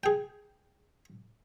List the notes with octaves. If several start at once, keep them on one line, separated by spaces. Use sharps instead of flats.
G#4 G5